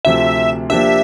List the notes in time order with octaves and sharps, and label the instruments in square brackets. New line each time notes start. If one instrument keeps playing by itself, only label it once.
[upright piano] D2 C3 F3 [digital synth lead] E5
[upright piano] F3 A#3 D4 G4 [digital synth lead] E5